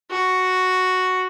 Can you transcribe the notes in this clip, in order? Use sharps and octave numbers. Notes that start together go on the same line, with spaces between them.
F#4